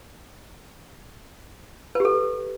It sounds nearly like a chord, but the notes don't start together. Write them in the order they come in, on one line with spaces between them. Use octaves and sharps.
B4 G4 A4